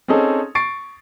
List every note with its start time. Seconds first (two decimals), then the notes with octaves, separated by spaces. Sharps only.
0.08 C4 C#4 D#4 G#4 A4
0.55 C#6 A6 C7 D7